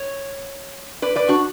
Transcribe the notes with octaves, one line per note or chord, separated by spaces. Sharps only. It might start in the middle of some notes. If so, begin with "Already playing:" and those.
Already playing: C#5
B4 D5
B4 D5
D4 F#4